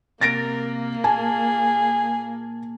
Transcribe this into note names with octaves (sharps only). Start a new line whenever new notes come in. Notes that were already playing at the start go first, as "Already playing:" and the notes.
C3 A#3 A#4 A6 A#6 D7
A#2 G#4 G#5 A5